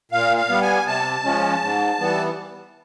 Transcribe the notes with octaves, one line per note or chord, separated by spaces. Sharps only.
A#2 F5
F5
G3 B3
G#5
C3 A5
F3 G#3 C#4
G#2
E3 G3 B3